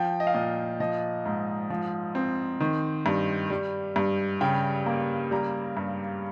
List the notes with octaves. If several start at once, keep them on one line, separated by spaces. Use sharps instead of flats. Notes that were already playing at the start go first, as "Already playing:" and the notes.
Already playing: F3 G5
D#5
F5
A#2 D#5
F3 D#5
G#2
F3
C4
D#3
G2
G3
G2
C#3 G5
A#3
G3 A#5
G2